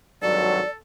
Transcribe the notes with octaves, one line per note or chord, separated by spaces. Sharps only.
G#1 G2 F#3 A4 D5